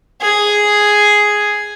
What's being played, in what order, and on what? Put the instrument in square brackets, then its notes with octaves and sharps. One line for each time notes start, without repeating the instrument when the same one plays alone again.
[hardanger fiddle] G#4